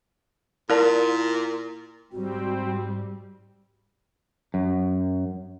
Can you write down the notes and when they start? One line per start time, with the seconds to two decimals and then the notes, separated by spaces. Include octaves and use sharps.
0.70 A#2 E4 A#4 D5 A5
2.12 G#2 G3 C4 F#4
4.54 F#2